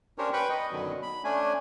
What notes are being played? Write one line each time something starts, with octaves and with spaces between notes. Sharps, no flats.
C#4 D4 G4 A#4 C5 C#5
B4 G5 B5 C#6
D#5
F#2 B2 D3 D#3 F#3
B5
A3 C#4 D4 G#5